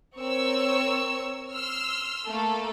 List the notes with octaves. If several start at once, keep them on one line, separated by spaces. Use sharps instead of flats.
C4 A#4 C#5 C#6 E6
C6 E6 F6
A3 A#3 A4